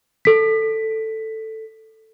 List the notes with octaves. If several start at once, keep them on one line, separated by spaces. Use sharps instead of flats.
A4 B6